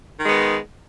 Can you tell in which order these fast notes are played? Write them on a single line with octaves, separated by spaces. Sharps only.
D#3 G#3 B3